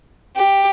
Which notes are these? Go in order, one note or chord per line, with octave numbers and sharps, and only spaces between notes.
G4